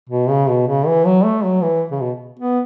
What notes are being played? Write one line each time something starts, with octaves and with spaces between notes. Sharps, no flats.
B2
C#3
B2
C#3
E3
F#3
A3
F#3
E3
C#3
B2
B3